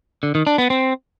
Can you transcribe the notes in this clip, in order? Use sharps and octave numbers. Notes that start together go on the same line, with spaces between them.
D3
D#3
D4
B3
C4